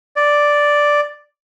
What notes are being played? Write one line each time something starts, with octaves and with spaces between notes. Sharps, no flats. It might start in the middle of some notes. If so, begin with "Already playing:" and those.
D5